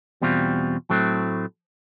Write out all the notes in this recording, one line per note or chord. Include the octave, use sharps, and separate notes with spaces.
E2 B2 G3 C4 F4
A2 F#3 A3 C4